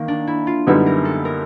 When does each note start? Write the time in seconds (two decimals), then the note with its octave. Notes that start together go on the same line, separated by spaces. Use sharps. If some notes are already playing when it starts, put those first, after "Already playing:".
Already playing: D#3 A#3
0.08 D4
0.27 E4
0.47 F4
0.67 F#2 D3 G3 B3 D#4 E4
0.86 A#4
1.05 A4
1.25 A#4